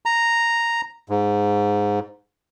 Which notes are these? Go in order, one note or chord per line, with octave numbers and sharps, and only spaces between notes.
A#5
G#2